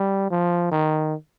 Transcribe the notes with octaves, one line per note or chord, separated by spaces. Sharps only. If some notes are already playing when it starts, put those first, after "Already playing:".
Already playing: G3
F3
D#3